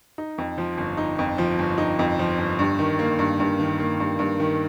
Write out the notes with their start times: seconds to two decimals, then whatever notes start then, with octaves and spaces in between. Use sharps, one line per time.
0.18 D#4
0.38 F2
0.58 F3
0.78 G1
0.97 D#4
1.19 F2
1.38 F3
1.59 G1
1.78 D#4
1.99 F2
2.19 F3
2.38 G1
2.59 G2
2.79 D#3
2.99 A#3
3.19 G2
3.40 G2
3.60 D#3
3.79 A#3
4.00 G2
4.19 G2
4.40 D#3